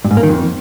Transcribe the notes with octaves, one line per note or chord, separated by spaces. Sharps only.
G2
G#2
A#3
D#3
F2